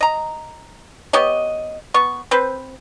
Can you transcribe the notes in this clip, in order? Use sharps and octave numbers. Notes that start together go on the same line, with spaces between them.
D#5 A#5
B3 G4 C#5 D#5
B3 C#6
C4 B4 C5